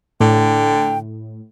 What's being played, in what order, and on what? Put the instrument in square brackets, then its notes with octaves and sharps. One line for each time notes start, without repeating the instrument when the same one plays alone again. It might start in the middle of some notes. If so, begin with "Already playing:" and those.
[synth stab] A2 [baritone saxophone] D3 [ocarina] G5